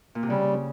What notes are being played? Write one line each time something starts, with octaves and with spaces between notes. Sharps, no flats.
A#2
C3
C#3 G3